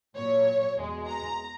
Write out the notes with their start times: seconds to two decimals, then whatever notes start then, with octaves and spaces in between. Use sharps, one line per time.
0.16 A#2 F#3 C#5
0.77 E2 B2 G#3
1.06 A#5